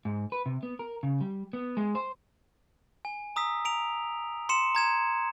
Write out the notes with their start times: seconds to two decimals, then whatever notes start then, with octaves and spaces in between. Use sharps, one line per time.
0.05 G#2
0.32 B4
0.46 C3
0.63 B3
0.79 A#4
1.03 C#3
1.21 G3
1.53 B3
1.77 G#3
1.95 C5
3.05 G#5
3.36 A#5 D#6 E6 B6
3.65 A#5 D7 F7
4.49 C6 C#7 E7
4.75 A#5 G#6 E7